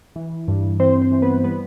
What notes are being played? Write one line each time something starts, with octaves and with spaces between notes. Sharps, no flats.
E3
G2
E3 C4 C5
C4 C5
E3
B3 B4
G3 B3 B4